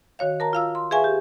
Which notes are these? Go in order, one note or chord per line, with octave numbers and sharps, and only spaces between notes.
D#3 F#4 C#5 F5
A#4 A5 A#5
F4 F5 E6
C6
G#4 B4 E5 F5 G#5 C#6
G4